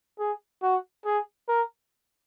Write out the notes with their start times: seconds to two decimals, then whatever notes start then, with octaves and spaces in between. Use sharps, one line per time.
0.19 G#4
0.63 F#4
1.06 G#4
1.48 A#4